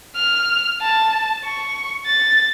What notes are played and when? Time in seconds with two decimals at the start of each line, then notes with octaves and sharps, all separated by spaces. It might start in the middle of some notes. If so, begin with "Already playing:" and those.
0.16 F6
0.81 A5
1.45 C#6
2.06 A6